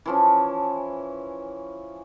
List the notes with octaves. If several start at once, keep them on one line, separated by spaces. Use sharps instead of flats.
E3 F3 C#4